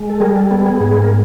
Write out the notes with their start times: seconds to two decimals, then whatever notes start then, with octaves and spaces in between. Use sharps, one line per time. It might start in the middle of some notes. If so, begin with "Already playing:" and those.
Already playing: G#3
0.10 A4
0.20 G3 G#4 A#4
0.36 A4
0.51 B3 A4
0.66 G#4
0.80 G#2 G#4
1.02 A#4